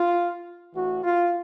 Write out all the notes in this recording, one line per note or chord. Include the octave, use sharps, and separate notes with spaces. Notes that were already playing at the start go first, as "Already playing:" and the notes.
Already playing: F4
A1 A2 E3 F#4
F4